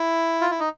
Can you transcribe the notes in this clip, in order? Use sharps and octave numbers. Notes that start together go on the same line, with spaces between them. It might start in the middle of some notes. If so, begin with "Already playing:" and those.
Already playing: E4
F4
E4
D#4